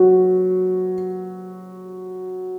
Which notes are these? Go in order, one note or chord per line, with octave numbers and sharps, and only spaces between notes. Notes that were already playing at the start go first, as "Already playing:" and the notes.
Already playing: F#3